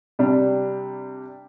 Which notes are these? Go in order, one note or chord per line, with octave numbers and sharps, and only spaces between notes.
C3 G3 D4